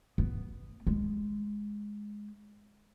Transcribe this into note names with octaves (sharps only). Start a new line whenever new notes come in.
B3
G#3